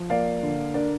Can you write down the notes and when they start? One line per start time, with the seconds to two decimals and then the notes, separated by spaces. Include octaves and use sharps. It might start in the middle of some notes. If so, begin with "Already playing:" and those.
Already playing: F3
0.10 A#3 D5 F5
0.43 D3
0.74 D4 A#4 D5